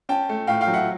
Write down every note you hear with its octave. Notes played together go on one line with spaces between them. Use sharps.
C#4 G5 A5
A3
A2 F5 G5
F5 G5
F#3
E5 F#5